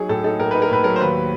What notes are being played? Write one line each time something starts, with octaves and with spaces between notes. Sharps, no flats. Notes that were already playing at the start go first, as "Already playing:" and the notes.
Already playing: F#3 D#4 G#4
A2 A4
D#4 A4
A2 A#4
D#4 B4
A#4
A2 B4
F#3 A#4
C5
D#2 B4